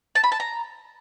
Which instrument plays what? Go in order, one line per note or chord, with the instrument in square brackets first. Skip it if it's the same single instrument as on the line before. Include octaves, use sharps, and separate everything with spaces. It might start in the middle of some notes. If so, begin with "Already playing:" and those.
[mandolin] A5
B5
A5
A#5